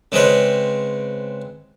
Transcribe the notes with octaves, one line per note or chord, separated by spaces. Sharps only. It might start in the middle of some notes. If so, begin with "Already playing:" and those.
C#3 G#3 C4 B4 C#5